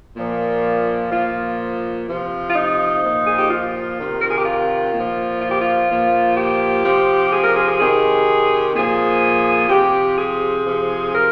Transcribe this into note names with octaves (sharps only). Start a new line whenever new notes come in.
A#2 F3
A#2 F3 F4
C3 F3
F4
D#4
A#2 F3
G#4
G4
F4
C3 D#3
A#4
G#4
G4
F4
A#2 F3
F4
G4
F4
A#2 F3
G4
C3 F3
G#4
A#4
G#4
G#4
C3 D#3 G#4
A#2 F3 G#4
C3 F3 G4
G#4
C3 F3
A#4